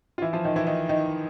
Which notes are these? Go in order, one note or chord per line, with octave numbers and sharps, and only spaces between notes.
F4
E3 E4
F3 F4
D#3 D#4
E3 E4
D#3 D#4
D#3 D#4